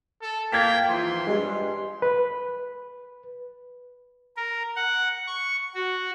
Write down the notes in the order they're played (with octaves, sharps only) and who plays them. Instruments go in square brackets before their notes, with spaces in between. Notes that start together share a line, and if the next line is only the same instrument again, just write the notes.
[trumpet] A4
[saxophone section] A#3 [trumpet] G5 [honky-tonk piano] G#6 A6 B6
[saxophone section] G#2 E3 F3 [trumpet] C6
[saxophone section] G2 [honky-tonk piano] G#3
[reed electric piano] B4
[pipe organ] A#4
F#5
C#6
F#4